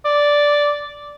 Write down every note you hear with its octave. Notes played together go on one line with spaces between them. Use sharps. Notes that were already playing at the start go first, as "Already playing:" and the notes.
D5